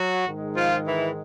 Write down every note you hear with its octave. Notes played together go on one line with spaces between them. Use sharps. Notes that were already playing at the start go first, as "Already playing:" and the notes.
Already playing: F#3 F#4
G#2 D#3 G#3
F3 F4
E3 E4